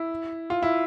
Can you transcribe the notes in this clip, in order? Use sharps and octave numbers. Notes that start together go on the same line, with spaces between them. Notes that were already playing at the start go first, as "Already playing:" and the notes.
Already playing: E4
F4
E4